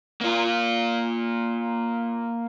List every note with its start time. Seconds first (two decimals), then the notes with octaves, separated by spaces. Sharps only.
0.21 A#3 F4